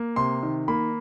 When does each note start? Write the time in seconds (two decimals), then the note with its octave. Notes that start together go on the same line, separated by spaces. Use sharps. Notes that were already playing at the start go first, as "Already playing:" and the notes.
Already playing: A#3
0.16 C3 C6
0.43 D#3
0.68 A#3 B5